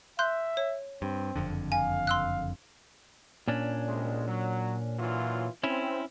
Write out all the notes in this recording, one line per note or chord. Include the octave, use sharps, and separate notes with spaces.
E5 C6 F#6 G6
C#5
G2 C4
F#1 F2 D3
F5 G#5
C6 E6 F#6
A#2 C#4 D4
C2 G#3
F#3
E3 F#3 F4
C4 C#4 E4